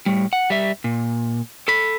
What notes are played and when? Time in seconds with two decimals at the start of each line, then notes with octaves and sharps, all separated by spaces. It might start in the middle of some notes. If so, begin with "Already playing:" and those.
0.06 A2 G3
0.33 F#5
0.50 G3 E5
0.84 A#2
1.68 A4 B5